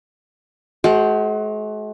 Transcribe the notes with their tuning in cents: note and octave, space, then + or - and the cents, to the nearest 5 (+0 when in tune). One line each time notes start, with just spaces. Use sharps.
G#3 +45 F#4 +20 C5 +0